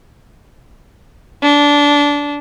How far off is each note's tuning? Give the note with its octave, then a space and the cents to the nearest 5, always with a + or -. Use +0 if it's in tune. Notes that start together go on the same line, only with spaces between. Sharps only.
D4 -20